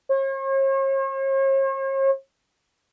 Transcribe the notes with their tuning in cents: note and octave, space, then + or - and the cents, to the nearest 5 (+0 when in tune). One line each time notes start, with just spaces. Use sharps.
C#5 -45